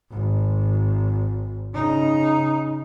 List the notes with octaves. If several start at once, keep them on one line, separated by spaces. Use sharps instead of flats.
G#1
C#3 D#4